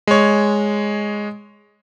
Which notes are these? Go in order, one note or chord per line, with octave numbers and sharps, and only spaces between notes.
G#3 C#5